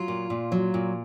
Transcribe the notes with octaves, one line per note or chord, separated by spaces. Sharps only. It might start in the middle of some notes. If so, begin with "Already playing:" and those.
Already playing: F#3 F4
A#2
A#2
F#3
A#2